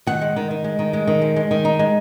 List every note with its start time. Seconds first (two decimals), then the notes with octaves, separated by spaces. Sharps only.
0.07 D#3 F#5
0.21 G#3
0.36 D#3
0.51 D#3
0.64 G#3
0.79 D#3
0.93 G#3
1.07 D#3
1.22 G#3
1.36 G#3
1.51 D#3
1.65 D#4
1.79 G#3